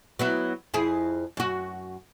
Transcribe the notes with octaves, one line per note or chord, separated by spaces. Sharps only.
F#3 B3 E4
F2 E4 G#4
F#2 F#4